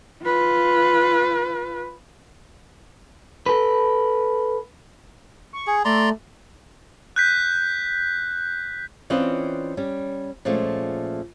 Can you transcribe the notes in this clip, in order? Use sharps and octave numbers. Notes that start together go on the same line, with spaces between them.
F4 B4
A4 B4
C#6
G#4
A3 D5 A#5 C6
F#6 G6 B6
E3 C4 C#4 F4 D5 D#5
G3 C#4
A#2 F3 G#3 A3 C#4